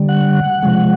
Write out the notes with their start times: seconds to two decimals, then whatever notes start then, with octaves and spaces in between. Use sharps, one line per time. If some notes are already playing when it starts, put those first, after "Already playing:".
Already playing: D3 G3
0.09 F#5
0.63 C3 F3 G#3